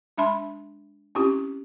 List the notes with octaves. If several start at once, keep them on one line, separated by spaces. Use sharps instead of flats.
G#3 D4 E5 A5 B5 C6
C4 C#4 E4 F4 G4